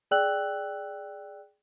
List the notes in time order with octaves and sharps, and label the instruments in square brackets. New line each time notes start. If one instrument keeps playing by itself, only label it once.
[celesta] G#4 D5 G5 E6 F#6 F#7